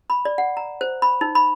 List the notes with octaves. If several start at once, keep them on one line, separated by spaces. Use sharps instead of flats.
B5
D5
F#5
A#5
C5
B5
D#4
B5